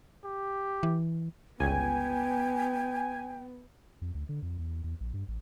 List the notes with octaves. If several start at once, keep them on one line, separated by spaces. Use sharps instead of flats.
G4
E3
G1 C#2 B3 G5 G#5
F2
D2
D3
F2
E2
E2
A#1
G2
A1